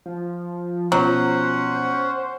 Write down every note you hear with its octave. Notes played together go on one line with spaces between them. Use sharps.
F3
B2 F3 F#3 C#4 C5 F#5